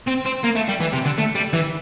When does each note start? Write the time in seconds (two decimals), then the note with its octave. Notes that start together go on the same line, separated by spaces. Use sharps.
0.07 C4
0.25 C4
0.44 A#3
0.55 A3
0.68 G3
0.80 E3
0.92 C3
1.05 D3
1.18 A3
1.35 G3
1.53 E3